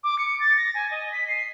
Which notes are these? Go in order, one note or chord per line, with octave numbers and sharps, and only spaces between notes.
D6
C#7
A6
A#6
G#5
D#5
B6
C7